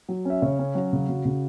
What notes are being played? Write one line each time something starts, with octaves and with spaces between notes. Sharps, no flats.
F#3
C#4 E5
C#3 C#5
C#4
F#3 F#4
C#3
C#3
C#3